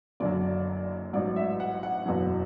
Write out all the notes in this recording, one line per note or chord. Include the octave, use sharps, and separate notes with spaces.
F#1 F#2 D3 F#3 D5
A1 G#2 F#3 D5
E5
F#5
F#5
F#1 E2 B2 F#3